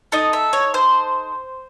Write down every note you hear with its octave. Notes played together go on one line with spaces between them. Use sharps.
D#4 A4 D#5
E5
C#5
C5